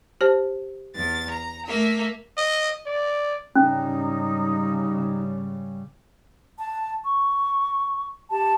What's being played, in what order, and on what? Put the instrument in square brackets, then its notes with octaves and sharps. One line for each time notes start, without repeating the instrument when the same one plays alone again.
[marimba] G4 C5 A5
[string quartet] E2 A6
A#5
A3 A#3 E5
[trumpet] D#5
D5
[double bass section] G#2 C#3 G3 [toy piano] C#4 [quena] D#4
[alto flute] A5
C#6
[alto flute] G4 [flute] A5